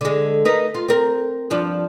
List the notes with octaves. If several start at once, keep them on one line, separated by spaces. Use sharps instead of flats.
D3 G#3
D#4 A#4 B4
F4
C4 A#4
G2 F3 D4